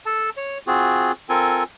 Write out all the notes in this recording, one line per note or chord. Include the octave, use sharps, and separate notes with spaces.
A4 A5
C#5
C4 F4 F#4 G#4
C4 F4 A4 A#4 G#5